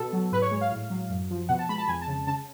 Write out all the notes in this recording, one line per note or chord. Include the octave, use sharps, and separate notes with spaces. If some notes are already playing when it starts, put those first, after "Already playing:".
Already playing: B2 A4
F#3
G#2 B4
C#5
G#3
F5
A2
F#3
F#2
F3
B2 F#5
A5
G#3 B5
A5
F2 G#5
A5
C#3
C#3 A5